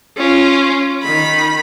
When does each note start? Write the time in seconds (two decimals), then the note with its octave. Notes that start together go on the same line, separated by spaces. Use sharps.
0.17 C#4 F4
1.02 D#3 B5